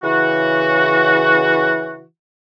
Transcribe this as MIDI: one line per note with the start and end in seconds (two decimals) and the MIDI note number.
0.04 2.03 49
0.04 2.03 52
0.04 2.03 66